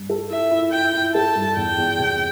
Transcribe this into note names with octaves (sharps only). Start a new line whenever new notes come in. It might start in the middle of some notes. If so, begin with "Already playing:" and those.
Already playing: G2
A4
E4 E5
E4
E4 G5
E4
A4 A5
G2
E2 G5
E2
C3